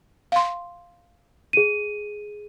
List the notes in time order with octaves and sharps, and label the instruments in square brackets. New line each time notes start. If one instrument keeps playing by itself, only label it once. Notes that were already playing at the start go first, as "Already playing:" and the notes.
[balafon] F5 C6
[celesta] G#4 D#7